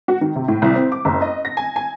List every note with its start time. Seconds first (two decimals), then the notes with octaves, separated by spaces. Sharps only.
0.08 F#4
0.21 D#3
0.36 C3
0.48 A2
0.62 C2
0.75 C4
0.92 D6
1.05 F#1
1.22 D#5
1.45 A#6
1.57 G#5
1.76 G#5